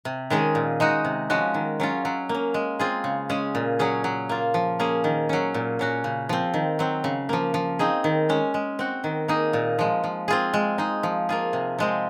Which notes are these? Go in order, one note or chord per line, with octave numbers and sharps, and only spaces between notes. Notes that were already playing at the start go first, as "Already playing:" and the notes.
C3
D#3 G#3 C#4 G#4
A#2
G#3 D#4 F#4
C3
F3 G#3 C#4 F#4
D#3
F#3 C#4 F4
F#3
A#3
C#4
G#3
C4 F4 G#4
C#3
G#3 C#4 G#4
A#2
F#3 C#4 G#4
F#3
A#3 F4
F3
A#3 C#4 G#4
D#3
F#3 C#4
A#2
F#3 C#4 F#4
C#3
F3 C4
D#3
F#3 C4
C#3
F3 A#3
F3
C4 D#4 G#4
D#3
G#3 C#4
G#3
C4 F#4
D#3
A#3 D#4 G#4
A#2
F3 G#3
F3
C4 F4 G#4
G#3
D#4 G#4
F3
A#3 F4 G#4
C3
F3 G#3 C4